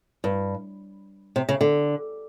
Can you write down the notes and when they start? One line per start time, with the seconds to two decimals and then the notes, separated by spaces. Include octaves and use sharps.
0.24 G2
1.36 C3
1.49 C#3
1.61 D3